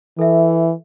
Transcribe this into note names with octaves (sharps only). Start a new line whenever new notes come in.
E3 A4 E5